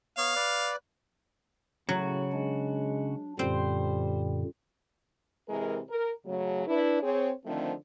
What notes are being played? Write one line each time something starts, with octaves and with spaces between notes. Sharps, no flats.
B3 C#5 F5
B4 D5
A2 C#3 F#3 F#4
G#3 D4
F#2 A#2 D3 G3 C4 C5
C3 E3 G#3 G#4 A#4
A#4
C#3 F#3 A3
D4 E4 B4
C4 G#4 C#5
D3 D#3 F3 A3 C4